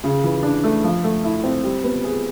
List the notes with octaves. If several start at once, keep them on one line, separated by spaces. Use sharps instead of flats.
C#3
E3
D4
A3
F3
A3
E4
C4
G3
B3
G#4